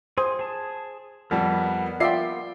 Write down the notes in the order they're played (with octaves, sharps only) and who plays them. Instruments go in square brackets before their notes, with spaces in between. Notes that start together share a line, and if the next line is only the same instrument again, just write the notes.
[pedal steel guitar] G#4 C6 D#6 [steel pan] C5
[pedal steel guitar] G#4 A5
[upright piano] F2 G3 [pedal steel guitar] B3 A#4 [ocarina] F#5
[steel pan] F4 D5 E5 [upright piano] G5 C7